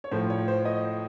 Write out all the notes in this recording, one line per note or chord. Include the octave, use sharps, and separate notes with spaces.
C#5
A2 F3 C5
C#5
C5
D#5